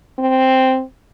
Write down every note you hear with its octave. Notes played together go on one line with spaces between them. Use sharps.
C4